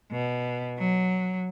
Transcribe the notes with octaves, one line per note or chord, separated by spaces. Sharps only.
B2
F#3